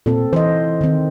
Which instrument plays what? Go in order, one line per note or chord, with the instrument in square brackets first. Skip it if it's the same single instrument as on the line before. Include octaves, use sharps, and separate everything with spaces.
[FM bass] A#2 [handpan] C4 A4
[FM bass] E3 [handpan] C5 D#5
[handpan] D#3 C4